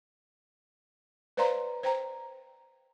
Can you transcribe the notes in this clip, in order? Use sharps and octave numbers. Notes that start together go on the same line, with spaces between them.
B4 C5 D5 F5 A#5 C6
C5 G5 A#5